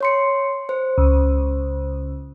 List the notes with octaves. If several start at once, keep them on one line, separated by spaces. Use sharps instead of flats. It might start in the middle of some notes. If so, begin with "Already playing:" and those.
C#5 C6 C#7
C5
C#2